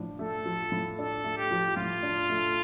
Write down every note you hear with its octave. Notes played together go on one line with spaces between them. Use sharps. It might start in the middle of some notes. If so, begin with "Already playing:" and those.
Already playing: A2 F3 D4
A3 A4
F3
A2
D4 A4
A3
G4
F3
A2 F4
D4
A3